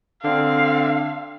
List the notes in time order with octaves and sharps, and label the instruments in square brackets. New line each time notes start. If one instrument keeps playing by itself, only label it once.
[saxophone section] D3 C4 D4 [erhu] F5